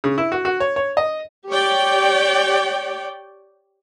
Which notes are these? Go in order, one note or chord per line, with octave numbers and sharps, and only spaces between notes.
C#3
E4
F#4
F#4
C#5
C#5
D#5
G4 C#5 D5 G5